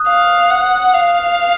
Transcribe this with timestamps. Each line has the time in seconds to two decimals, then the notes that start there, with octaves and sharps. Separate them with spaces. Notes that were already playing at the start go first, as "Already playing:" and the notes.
Already playing: D#6 F#6
0.08 F5
0.51 F#5
0.93 F5